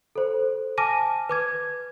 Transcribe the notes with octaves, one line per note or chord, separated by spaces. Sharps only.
A4 C5
G#5 A5 D6 F6 A#6 D#7
B4 D6 G#6